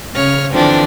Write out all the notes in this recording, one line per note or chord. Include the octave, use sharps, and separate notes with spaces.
C#3 C#5 F6
D3 E3 F3 C4 D4